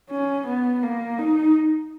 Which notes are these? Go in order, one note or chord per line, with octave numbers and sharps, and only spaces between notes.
C#4
B3
A#3
D#4